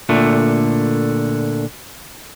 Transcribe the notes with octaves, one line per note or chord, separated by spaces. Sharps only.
A#2 D3 A3